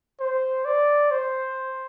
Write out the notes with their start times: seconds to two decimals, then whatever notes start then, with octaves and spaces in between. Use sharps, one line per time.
0.20 C5
0.65 D5
1.11 C5